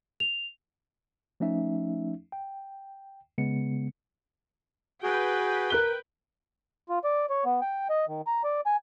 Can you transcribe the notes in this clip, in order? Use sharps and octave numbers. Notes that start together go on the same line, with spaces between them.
F7
F3 A3 C#4 D#4 E5
G5
C#3 G#3 B3 C#7
F#4 G#4 B4 G5
A#4 F#6 G7
F4
D5
C#5
B3
G5
D#5
D#3
A#5
D5
G#5